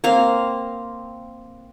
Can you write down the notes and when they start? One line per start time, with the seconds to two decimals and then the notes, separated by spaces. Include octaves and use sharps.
0.04 A#3 C4 F5